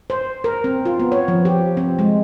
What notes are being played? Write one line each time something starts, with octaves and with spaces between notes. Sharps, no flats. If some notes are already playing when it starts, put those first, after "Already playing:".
C5
A#4
C4
F4
B3
C#5
F3
G4
C4
G#3